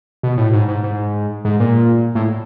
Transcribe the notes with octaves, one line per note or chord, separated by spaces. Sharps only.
B2
A2
G#2
G#2
G#2
G#2
A#2
A2